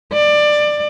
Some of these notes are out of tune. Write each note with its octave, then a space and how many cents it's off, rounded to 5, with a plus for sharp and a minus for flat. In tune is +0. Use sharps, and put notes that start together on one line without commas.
D5 +20